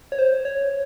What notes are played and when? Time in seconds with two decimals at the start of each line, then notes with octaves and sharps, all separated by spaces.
0.12 C#5
0.19 C5
0.45 C#5